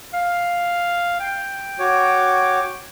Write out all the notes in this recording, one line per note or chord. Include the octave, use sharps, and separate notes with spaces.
F5
G5
F#4 C#5 D6